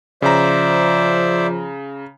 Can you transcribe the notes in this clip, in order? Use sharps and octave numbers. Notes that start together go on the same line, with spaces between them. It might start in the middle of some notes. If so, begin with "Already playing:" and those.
C#3 F3 C5 D5 E5 A#5